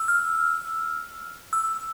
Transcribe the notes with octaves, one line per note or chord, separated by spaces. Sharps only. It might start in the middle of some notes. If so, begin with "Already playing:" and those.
Already playing: E6
F6
E6